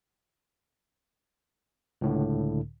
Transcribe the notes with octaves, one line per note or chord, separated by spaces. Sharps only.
C#2 A2 D3